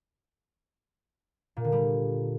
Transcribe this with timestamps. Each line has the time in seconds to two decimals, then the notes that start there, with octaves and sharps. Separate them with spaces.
1.57 A#2
1.64 D3
1.72 G3